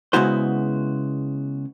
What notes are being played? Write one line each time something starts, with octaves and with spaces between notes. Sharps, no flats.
C#3 G#3 B3 E4 F#4 C5